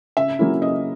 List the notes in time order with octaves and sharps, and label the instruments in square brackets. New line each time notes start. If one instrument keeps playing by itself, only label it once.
[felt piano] C#3 E5
F#3 A#3 C#4 E4
C#3 D#5